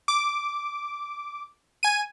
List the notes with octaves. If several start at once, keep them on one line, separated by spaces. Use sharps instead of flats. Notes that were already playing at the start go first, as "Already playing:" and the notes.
D6
G#5 D#7